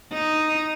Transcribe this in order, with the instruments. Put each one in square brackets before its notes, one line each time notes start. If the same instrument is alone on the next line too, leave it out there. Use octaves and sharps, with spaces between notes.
[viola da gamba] D#4